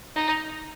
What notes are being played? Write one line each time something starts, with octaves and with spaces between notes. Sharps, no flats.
D#4